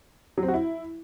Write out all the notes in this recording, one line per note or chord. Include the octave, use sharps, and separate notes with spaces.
F#3
C4
F#4
E4